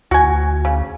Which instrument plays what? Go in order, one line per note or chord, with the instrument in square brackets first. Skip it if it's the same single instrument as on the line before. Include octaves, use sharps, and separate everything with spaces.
[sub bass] D2 [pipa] F#4 G#5
[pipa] C#3